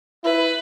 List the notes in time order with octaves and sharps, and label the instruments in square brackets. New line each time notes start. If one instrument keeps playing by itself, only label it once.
[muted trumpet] E4 [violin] B4